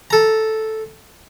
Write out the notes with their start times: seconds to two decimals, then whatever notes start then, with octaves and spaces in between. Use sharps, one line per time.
0.10 A4 A#5